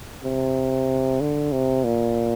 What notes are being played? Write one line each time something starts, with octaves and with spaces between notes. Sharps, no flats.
C3
D3
C3
A#2